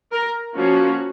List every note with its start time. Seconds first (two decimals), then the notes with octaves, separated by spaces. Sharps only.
0.12 A#4
0.55 F3 A#3 C#4 F#4